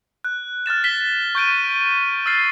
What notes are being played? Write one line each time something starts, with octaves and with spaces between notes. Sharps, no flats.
F#6
F6 F#6 A6 E7
B6 E7 G7
C#6 G6 D7 D#7
E6 F6 A6 C7